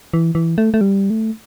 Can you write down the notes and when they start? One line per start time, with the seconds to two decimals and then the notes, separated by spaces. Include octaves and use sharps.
0.14 E3
0.35 E3
0.58 A3
0.74 A3
0.81 G3
1.10 A3